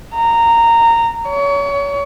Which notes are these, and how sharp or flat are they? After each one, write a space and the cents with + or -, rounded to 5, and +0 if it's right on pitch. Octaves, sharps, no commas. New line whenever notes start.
A#5 -15
C#5 +30